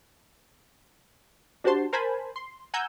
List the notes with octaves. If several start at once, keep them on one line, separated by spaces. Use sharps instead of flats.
D4 F#4 G4 C5 A5 C6
A#4 C5 G#5 A5 B5
C6
F#5 G#5 A#5 E6 G6